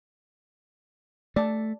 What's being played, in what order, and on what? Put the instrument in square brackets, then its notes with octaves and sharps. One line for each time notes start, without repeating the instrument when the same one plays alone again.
[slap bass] A3 [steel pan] D5 A5